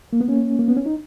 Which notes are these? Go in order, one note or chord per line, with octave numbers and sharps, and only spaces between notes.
A#3
B3
A#3 C#4
A#3
B3
C#4
D#4